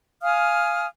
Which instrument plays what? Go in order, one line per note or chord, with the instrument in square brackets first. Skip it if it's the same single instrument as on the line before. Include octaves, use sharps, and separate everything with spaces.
[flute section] F5 G#5 D#6 F6